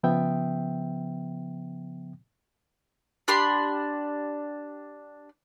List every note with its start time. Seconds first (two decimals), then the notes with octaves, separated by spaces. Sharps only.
0.03 C#3 F3 B3 E5 G5
3.28 D4 G4 B5 C6